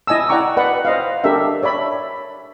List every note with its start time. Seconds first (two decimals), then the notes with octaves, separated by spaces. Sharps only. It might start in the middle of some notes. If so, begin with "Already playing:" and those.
0.07 E4 D#5 G#5 A5 E6
0.29 D5 F#5 G5 A#5 C#6 D6
0.57 B4 D5 F#5
0.85 C5 D#5 F5
1.24 D4 G4 A4 A#4 E5
1.63 C#5 D5 E5 B5